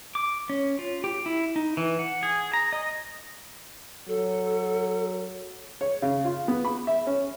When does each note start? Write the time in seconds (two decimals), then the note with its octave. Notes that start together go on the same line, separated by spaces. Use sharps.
0.15 D6
0.50 C#4
0.79 F4
1.04 G4
1.26 E4
1.56 D#4
1.77 E3
1.99 F#5
2.23 G#4
2.53 A#5
2.73 D#5
4.08 F#3 A4
5.81 C#5
6.02 C#3
6.25 F4
6.48 B3
6.65 B5
6.87 E5
7.07 C#4